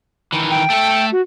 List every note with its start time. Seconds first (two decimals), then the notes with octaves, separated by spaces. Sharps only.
0.33 D#3 E3
0.51 G5
0.70 A3 A4
1.12 F#4